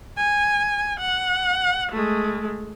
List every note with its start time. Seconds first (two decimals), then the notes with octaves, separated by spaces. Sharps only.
0.17 G#5
1.00 F#5
1.92 G#3 A3